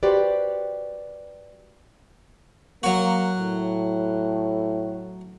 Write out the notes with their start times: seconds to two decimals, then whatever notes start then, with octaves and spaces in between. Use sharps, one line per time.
0.03 F#4 G4 B4 C5 D5
2.83 F#3 A#3 F#4
3.38 A2